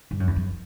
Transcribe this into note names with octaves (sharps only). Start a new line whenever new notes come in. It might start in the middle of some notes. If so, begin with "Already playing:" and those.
G2
F#2
E2
F#2